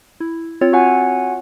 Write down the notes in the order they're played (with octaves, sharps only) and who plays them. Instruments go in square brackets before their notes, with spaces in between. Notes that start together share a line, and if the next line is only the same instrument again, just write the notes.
[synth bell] E4
C4 F4 C#5
[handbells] F#4 F#5 G#5